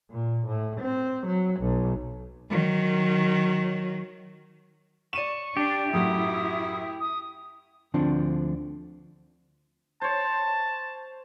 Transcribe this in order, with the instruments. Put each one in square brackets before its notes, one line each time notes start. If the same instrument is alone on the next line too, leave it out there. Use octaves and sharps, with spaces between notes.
[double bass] A#2
A2
C4
F#3
B1
[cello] D#3 F#3
[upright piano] D5 D#7 E7 [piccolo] C#6
[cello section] D4 [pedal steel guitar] G4
[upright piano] F#2 A2 F#3 [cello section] E4 [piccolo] D#6
[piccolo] D#6
[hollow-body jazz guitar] D2 D3 F3 C4 D4
[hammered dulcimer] C5 C#5 [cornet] A5